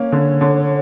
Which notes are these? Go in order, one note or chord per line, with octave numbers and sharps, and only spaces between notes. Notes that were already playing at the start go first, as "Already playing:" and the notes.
Already playing: A#3 C#4 C#5
D3
D3